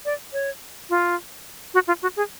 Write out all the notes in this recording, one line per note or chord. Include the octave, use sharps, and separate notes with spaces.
D5
C#5
F4
F#4
F4
F#4
G#4